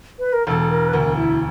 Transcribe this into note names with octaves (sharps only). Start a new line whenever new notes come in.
B4
A#4
E1 A4
A4
A#4
B4
D2 A#4
E4